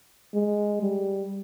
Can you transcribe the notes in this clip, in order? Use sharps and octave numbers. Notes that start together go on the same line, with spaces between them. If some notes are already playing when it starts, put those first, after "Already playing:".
G#3
G3